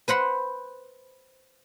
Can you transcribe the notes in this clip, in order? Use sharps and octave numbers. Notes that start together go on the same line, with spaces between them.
B4 C5 F#5 B5